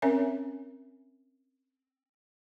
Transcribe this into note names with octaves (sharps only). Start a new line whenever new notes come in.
C4 C#4 A#4 C#5 E5 G#5